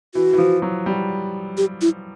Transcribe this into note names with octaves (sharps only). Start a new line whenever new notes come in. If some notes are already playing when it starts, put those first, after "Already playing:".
E3 F#4
E3
F3
F#3
G3
G4
E4